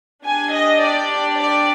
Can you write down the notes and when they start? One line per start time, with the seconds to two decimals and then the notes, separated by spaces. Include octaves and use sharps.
0.23 D4 G4 G#5
0.53 D#5
0.81 D5
1.38 D5